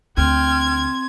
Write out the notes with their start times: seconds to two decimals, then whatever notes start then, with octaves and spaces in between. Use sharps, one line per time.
0.17 D2 D3 C4 G5 C6 F6 G#6